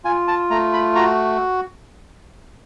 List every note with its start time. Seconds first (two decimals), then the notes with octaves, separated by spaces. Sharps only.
0.05 F4 G#5
0.28 A5
0.50 A3 A#5
0.73 B5
0.95 F#4 A#5